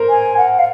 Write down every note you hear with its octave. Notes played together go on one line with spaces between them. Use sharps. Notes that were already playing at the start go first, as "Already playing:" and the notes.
Already playing: A#4 C5
G#5
F#5
F5